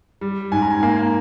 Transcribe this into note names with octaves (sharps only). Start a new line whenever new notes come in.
G3
G#2 G#5
A#5
G#5
A#3 A#5